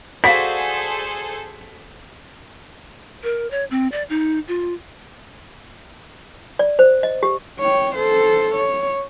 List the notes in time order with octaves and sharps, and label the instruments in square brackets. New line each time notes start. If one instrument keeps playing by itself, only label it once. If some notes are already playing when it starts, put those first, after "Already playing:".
[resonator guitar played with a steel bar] F#4 [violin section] G#4 A4 C5 [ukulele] D5 F5 [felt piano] B6
[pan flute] A#4
C#5
C4
D5
D#4
F4
[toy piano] D5
C5
D#5
G4
[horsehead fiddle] C#5 G5
A4 C5
C#5